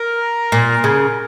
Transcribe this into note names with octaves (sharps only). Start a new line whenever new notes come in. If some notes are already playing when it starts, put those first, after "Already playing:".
Already playing: A#4
A#2
C#3